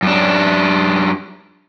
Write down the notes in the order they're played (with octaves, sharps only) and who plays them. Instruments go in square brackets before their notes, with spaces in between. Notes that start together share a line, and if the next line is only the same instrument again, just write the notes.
[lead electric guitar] F#2 D4